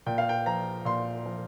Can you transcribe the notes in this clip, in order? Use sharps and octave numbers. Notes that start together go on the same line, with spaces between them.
A#2 G5
F5
G5
F3 A#5
A#2 C6
F3